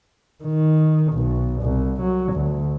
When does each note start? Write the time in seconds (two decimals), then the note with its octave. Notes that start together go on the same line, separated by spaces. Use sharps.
0.44 D#3
1.13 B1
1.62 C2
2.02 F#3
2.33 D2